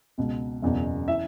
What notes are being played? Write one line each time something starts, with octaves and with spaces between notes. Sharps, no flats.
C#2 B2
F#1 E2 B2
E3 E5